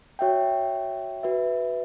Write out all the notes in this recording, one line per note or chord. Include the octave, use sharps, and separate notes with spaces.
F#4 C#5 E5 G5
F#4 B4 E5